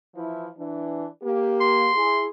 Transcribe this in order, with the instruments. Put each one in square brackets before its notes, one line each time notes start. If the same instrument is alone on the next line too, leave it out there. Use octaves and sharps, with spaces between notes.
[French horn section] E3 F3 E4
E3 D4
A#3 G4
[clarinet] C6
[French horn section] E4 G#4